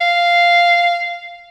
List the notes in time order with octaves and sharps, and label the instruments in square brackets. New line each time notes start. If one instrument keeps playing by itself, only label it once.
[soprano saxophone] F5